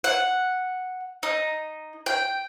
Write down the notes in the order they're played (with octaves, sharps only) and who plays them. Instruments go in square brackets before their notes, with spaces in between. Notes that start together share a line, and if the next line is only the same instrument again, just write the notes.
[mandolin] F#5
D#4
G5